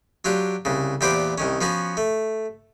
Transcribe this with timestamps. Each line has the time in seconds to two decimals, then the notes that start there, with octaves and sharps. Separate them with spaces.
0.25 F#3 D4 F4 G4
0.65 C2 C#3
1.01 E2 A#2 G4 B4 C5 D6
1.38 C2 D#3 C#4
1.61 F3 B3 C#4 F#4
1.97 A3